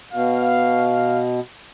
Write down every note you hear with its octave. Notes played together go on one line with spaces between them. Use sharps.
B2 F5